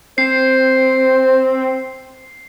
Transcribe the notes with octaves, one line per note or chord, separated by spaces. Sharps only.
C4 C5 C7